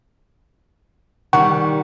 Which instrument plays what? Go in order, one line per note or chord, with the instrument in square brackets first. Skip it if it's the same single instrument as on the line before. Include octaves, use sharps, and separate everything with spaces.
[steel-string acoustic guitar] D#3 G3 [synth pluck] F#5 [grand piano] C#6